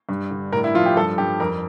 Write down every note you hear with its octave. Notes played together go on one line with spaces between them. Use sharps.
G2
D3
A2 A#4
E4
F3 F4
G4
G2 A4
G2 G4
F2 A#4